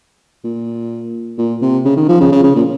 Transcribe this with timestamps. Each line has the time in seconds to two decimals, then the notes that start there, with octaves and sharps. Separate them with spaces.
0.44 A#2
1.38 A#2
1.62 C3
1.85 C#3
1.97 D#3
2.09 F3
2.21 C#3
2.32 C#3
2.44 C#3
2.56 A#2